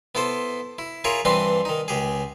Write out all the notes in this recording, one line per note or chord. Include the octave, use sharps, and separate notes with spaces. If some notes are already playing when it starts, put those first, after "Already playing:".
B3 E4 A4 C5
E4
E4 F4 G#4 A#4 C#5
G2 E3 C4 D4 B4 C6
D#3 D#4
C#2 G4 G#4